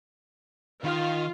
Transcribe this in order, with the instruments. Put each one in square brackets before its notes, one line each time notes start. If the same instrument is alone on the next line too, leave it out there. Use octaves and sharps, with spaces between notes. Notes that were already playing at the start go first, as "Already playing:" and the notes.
[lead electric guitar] D#3 [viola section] F4